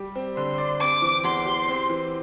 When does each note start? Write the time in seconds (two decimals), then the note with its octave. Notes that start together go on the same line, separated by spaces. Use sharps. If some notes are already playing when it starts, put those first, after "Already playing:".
Already playing: G3 G4
0.16 C4
0.37 D3 C6
0.58 D5
0.80 C4 D6
1.02 E3
1.24 E2 C6
1.46 G4
1.69 C4
1.90 E3